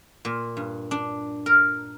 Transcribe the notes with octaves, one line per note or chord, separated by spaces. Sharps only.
A#2
G2
D4
A#4